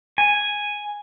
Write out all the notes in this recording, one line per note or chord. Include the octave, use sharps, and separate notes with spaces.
G#5